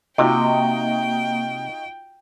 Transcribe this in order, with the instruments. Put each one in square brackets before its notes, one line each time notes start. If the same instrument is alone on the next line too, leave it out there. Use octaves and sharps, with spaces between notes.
[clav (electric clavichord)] C3 [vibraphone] A#3 [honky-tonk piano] D#4 F4 F#4 [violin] G5